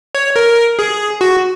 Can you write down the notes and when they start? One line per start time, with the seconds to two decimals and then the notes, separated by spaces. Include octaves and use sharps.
0.15 C#5
0.36 A#4
0.79 G#4
1.21 F#4